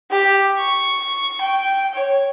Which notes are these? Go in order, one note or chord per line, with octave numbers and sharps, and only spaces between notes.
G4
C#6
G5
C#5